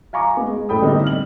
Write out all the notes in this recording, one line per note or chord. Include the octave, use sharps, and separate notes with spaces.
F5 G#5 A#5 C#6 D6
G#3 B3
G#3
F#1 A2 A4 G5 B5 D#6
D3 G3 A3 B3 C4 D#4
F6 F#7